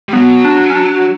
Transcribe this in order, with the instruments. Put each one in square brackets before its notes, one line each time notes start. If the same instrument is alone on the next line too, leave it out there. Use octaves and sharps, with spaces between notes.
[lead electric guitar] G3
[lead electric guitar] F#3 [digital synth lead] B3
[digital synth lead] D4
C#4
D4